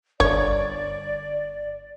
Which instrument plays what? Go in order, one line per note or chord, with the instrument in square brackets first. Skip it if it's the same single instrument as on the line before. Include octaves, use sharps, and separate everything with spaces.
[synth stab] G1 [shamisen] C#5 [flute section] D5